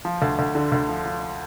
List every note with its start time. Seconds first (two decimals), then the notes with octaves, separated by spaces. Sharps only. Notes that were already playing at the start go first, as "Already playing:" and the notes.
0.05 F3
0.22 D2
0.39 D2
0.55 D3
0.72 D2
0.89 F3
1.06 F3